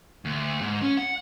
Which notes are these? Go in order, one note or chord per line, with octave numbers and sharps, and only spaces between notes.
D2
G#2
C#4
F#5